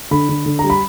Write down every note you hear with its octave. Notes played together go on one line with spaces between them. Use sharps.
D3 B5
D3
D3
G3 A#5
B5